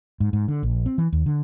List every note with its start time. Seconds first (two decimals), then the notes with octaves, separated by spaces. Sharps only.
0.20 G#2
0.33 G#2
0.48 D3
0.63 A#1
0.86 C4
0.98 E3
1.12 D#2
1.26 D3